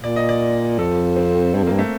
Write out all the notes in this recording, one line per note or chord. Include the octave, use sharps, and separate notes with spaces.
A#2 D5
D#5
D5
F2 A4
C4
G2 C4
F2 A#3
G2
A3